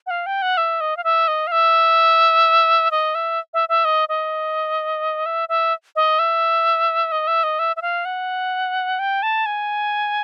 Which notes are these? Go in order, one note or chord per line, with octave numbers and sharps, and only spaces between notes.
F#5
F5
G5
F#5
E5
D#5
F5
E5
D#5
F5
E5
D#5
E5
E5
E5
D#5
D#5
E5
E5
D#5
E5
D#5
E5
D#5
E5
E5
F5
F#5
G5
A5
G#5